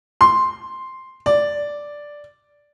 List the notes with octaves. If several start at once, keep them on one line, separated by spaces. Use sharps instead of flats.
C6
D5